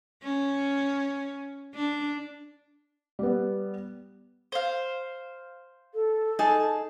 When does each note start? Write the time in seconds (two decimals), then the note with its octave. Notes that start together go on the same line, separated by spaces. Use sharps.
0.23 C#4
1.74 D4
3.19 G3 B3
4.52 C5 F5
5.94 A4
6.39 D#4 G#4 A5